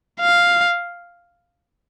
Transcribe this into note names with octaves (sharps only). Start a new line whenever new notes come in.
F5